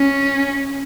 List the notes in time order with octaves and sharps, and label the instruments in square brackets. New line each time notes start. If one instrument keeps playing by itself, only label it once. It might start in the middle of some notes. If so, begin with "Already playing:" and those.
Already playing: [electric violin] C#4